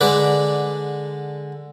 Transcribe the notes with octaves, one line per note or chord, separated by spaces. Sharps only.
D3 G#3 B4 D5